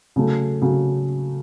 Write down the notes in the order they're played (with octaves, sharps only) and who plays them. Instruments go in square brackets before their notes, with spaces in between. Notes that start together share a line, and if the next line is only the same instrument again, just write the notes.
[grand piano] C#3 F#3 A3
C#3 F#3